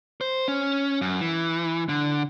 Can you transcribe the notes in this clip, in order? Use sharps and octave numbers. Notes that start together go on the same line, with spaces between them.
C5
C#4
F#2
E3
D3